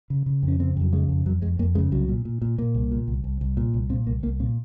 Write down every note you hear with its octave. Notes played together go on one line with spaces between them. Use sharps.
C#3
C#3
F2
C#4
C#3 C4
F2 F#3
C#3 G#3
F2
F2 F#3
F2 G#3
F2 A#3
C#3 G#3
C2 F#3
A#2
A#2
A#2
A#2 A#3
C2
A#2
C2
C2
C2
A#2
C2
A#2 C4
C2 A#3
C2 A#3
A#2 C4